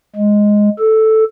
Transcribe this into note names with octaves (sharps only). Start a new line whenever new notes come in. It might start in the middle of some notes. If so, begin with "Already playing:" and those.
G#3
A4